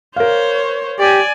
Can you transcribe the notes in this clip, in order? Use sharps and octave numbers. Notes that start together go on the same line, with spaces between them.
A#4 C5 C#5 F5
G4 D5 G#5